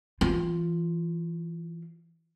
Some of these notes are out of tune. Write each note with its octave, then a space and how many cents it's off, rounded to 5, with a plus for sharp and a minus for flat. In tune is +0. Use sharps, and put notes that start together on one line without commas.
E3 +20 F4 +0